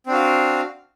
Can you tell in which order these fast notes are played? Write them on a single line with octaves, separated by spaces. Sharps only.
C4 D4 F#4 F5